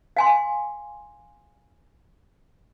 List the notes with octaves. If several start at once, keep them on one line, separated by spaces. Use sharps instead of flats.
F5 G#5 C6